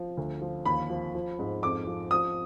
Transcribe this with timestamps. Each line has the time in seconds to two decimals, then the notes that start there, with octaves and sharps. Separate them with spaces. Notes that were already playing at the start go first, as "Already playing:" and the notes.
Already playing: F3
0.17 D2
0.41 F3
0.65 D#2 B5
0.90 F3
1.15 F3
1.39 G#2
1.63 F2 D6
1.87 F3
2.11 F3 D#6